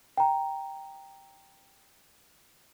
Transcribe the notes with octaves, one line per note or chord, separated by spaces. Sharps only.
G5 A#5